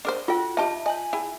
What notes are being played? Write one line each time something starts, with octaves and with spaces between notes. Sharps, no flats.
D4 A#4 C5 D#5
F4 F#4 A4 G5
D#4 F4 G4 E5 A5
D#5 G#5 B5 G6
E4 G#4 G5